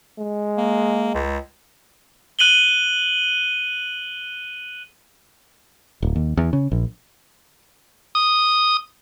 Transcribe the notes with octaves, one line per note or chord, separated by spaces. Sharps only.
G#3
A#3
C#2
F#6 D#7 F#7 G7
D1
D#2
E2
C#3
A#1
D#6